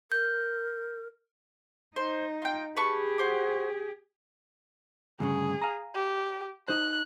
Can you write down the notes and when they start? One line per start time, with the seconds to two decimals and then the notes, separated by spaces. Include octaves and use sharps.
0.12 A#4 G6
1.96 D#4 C5
2.42 F4 G5
2.77 G4 G#4 B4 A5 C#6
3.18 F#4 C5 D6
5.20 D2 G2 C#3 G#4
5.62 F5 G#5 A#5
5.95 G4
6.68 D#4 C5 F#6